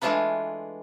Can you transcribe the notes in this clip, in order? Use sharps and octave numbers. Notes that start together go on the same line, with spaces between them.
E3 G#3 A3 D4 F4 B4